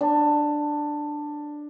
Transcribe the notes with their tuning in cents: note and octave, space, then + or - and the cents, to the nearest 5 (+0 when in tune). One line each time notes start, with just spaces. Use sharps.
D4 +10